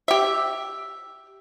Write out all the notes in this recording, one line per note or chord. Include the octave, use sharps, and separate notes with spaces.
G4 E5